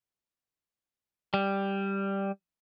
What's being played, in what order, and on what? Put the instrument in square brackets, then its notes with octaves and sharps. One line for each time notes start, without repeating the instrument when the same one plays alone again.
[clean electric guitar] G3